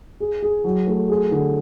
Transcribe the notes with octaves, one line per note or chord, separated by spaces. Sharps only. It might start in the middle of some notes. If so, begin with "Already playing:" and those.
G#4
G#4
F#3
A3
G#4
D3